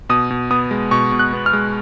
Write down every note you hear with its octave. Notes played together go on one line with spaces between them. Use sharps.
B2 D#6
B2
B3 D#6
G#3
B2 C#6
B2
F#6
B3
F6
G#3